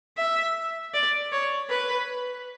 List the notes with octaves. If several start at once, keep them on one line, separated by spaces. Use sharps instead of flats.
E5
D5
C#5
B4